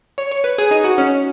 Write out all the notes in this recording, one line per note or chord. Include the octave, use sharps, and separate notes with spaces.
C#5
C#5
B4
G#4
D#4
F#4
C#4